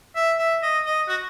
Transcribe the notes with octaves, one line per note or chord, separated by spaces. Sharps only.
E5
E5
D#5
D#5
F#4